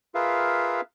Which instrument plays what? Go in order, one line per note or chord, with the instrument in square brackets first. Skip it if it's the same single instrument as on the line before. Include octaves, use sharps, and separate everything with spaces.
[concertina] F4 G#4 A#4 B4 E5 F5